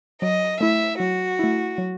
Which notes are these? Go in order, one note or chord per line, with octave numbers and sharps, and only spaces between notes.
F#3 D#5
A3 E4 E5
F#3 F#4
A3 E4
F#3